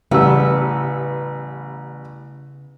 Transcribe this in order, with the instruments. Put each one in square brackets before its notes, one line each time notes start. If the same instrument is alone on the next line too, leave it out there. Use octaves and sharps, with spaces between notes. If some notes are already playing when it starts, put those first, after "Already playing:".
[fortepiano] A1 G3 E6 [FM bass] C#3 [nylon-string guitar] B3